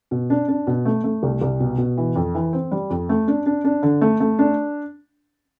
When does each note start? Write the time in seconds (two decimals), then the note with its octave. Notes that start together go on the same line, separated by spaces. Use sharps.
0.11 B2
0.30 D4
0.48 D4
0.67 B2
0.85 A3
1.04 A3
1.23 C2
1.41 C2
1.60 B2
1.78 B2
1.97 E3
2.16 F2
2.35 E3
2.53 C4
2.71 G3
2.90 F2
3.09 A3
3.28 D4
3.46 D4
3.64 D4
3.83 D3
4.01 A3
4.20 A3
4.39 D4